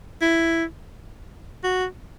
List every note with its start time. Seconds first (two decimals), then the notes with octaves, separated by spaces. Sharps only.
0.22 E4
1.64 F#4